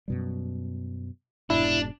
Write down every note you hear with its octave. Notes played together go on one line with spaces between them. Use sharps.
F#2 B2 G3
F1 G#2 B2 D4 E4